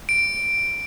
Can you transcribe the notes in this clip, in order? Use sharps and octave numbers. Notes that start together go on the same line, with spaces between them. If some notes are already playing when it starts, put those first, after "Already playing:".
D7